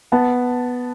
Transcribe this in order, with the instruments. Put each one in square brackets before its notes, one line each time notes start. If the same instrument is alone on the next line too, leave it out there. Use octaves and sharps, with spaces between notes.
[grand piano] B3 F#5 A5